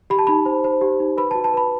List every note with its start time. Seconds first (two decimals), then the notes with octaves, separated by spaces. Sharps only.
0.10 G4 B5
0.19 A5
0.27 D#4 B5
0.46 C5
0.64 C5
0.81 G4
1.00 D#4
1.18 B4 B5
1.31 F#4 A5
1.44 A5
1.54 B4 B5